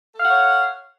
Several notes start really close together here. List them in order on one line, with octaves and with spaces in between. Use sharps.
A4 F5 F#5 C#5